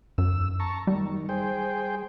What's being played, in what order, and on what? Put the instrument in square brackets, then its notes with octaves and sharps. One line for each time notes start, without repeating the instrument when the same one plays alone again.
[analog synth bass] F#2 [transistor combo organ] E6
[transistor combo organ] A5 A#5 C#6
[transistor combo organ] D#3 [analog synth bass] G3
[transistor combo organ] G#4 C5 G5